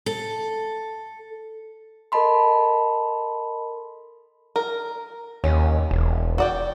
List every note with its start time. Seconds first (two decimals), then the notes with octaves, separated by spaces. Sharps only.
0.06 A4
2.12 A4 A#4 D#5 A5 B5 C6
4.56 A#4
5.44 D#2 C#4
5.91 E1
6.38 F#4 D5 G5